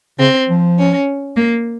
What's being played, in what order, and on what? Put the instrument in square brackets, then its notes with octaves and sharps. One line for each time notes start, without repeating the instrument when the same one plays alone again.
[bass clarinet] C#3 [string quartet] C4
[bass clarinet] F3
[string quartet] C#4
A#3